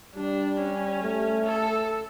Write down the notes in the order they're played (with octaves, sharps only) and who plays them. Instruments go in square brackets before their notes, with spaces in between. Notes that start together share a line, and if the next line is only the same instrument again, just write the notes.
[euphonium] G3 [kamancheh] D4
[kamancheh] C#4
[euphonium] A3
[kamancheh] A4